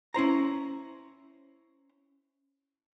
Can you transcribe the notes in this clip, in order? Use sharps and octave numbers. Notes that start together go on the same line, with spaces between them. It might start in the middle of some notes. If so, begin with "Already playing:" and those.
C#4 E4 C5 A#5